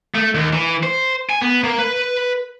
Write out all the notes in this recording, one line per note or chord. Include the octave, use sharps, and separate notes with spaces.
A3
D#2
E3
C5
G#5
B3
A#3
B4